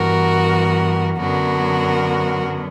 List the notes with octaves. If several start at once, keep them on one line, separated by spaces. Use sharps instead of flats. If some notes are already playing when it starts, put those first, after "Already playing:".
Already playing: G2 E3 B3 F#4 A#4
F#2 D3 F#3 B3 F#4 A#4